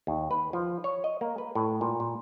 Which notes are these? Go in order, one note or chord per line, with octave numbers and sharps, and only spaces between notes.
D#2
B4
F3
C#5
D#5
A#3
B4
A2
A#2
A#2